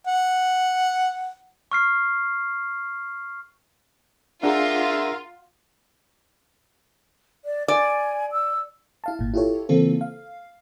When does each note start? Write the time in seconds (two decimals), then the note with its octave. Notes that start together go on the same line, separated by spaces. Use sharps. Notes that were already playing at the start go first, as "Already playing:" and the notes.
0.07 F#5
1.72 C#6 F6 C7
4.43 D4 F4 G#4 A#4 E5 F#5 A#5 C6
7.45 D5
7.68 D5 G#5
8.32 E6
9.04 E4 F5 A5
9.19 G#1 A#2
9.34 E4 F4 G4 A4 C#5
9.69 C#3 E3 A#3 C4 F4 A4
10.01 F5